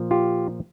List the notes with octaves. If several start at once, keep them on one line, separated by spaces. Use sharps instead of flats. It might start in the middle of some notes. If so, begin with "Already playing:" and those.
Already playing: A#2 F3
F4 G4